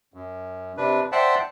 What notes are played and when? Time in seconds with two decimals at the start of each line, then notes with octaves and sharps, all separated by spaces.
0.14 F#2
0.77 C3 D4 B4
1.12 C5 D5 E5 F#5 G5 A5